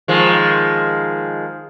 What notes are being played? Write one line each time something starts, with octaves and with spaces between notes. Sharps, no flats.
D#3 F3 G#3